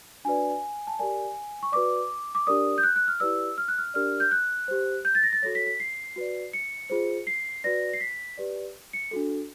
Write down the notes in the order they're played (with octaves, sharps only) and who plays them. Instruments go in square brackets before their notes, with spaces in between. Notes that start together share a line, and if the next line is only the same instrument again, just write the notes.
[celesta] D4 F#4 B4 D5 G#5
A5
G4 A#4 D5 G#5
C#6
F#4 B4 D5 D6
D6
D4 G4 A#4 D5 D#6
G6
F#6
F#6
F6
E4 G4 B4 D5 E6
F6
F#6
F6
D4 G4 A#4 D5 F6
G6
F#6
G4 C5
G6
A6
A#6
A6
F#4 A4 C#5 A#6
B6
B6
C7
F#4 B4 D5
C#7
F4 G#4 C5
C7
F#4 B4 D5 A#6
C7
B6
G4 B4 D5
C#7
D4 F#4 A4